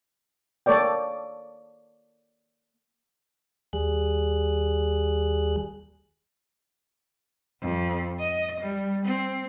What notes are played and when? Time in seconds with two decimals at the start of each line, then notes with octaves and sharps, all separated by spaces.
0.66 A#3 A4 C#5 D5 G5
3.73 D#2 G3 G#4 F#6
7.62 F2
8.19 D#5
8.61 G3
9.05 C4